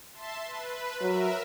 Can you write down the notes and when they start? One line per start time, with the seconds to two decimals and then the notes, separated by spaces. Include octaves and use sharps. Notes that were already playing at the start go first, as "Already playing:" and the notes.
0.13 E5 A5 C6
0.45 B4
1.01 F#3 A#4 E5